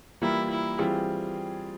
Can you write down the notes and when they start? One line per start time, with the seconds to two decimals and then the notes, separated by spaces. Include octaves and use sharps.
0.21 E3 G3 A#3 E4 F4
0.50 E4
0.79 E3 G3 C4 F4 G#4